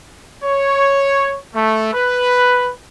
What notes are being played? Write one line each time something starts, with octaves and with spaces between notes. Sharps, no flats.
C#5
A3
B4